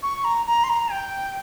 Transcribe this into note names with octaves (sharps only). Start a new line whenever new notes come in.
C#6
A#5
A#5
C6
A#5
G5